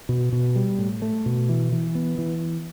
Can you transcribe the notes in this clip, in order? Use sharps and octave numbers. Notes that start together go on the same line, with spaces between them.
B2
B2
G3
A2
A3
B2
E3
E3
B3
E3